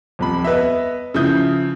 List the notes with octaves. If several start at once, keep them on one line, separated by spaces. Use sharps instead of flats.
D#1 F2 B5
B3 B4 D#5 E5
C#3 F3 E4 D#6 G6